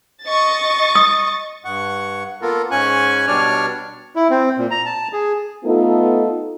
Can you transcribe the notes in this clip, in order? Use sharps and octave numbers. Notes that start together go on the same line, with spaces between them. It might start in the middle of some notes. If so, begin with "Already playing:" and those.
D#5 C#6 A6
D#6
G2 F#5 C#6
A#3 B3 F4 A4 A#4
G#2 C#4 G#5 C#6 F#6
B2 G3 D4 C#5 D5 F6
E4
C4
A#2
A#5
A5
G#4
A3 B3 D#4 F4 A4